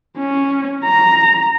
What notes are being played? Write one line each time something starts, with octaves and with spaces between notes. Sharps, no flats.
C#4
A#5